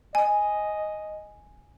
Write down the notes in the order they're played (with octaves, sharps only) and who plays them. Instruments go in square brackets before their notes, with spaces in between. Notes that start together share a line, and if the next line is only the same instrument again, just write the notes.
[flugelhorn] D#5 [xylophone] G#5